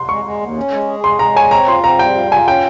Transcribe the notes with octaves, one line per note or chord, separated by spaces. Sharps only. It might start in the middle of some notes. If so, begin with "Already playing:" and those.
Already playing: C6
G#3 C#6
G#3
D#2
C#4
G#3
G#4
G#3 C6
G#3 A#5
C#5 G#5
C4 A#5
F4 C6
C4 A#5
G3 G5
F4
F4 G#5
C#4 G5